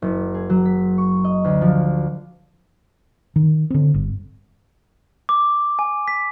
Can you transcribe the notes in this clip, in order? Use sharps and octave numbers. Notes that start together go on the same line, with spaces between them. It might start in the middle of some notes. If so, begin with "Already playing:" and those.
F#1
G#4
F#3
B6
C#6
D#5
D2
F3
D#3
D3 C4
G1
D6
G#5
B6